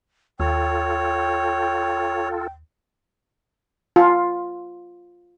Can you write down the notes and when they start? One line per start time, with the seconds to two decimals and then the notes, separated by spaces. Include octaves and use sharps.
0.40 D#2 F4 A4 C#5 G5
3.96 F4